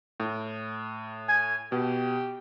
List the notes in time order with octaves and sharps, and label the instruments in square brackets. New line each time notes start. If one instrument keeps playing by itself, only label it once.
[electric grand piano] A2
[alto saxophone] G#5
[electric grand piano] B2 [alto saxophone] G4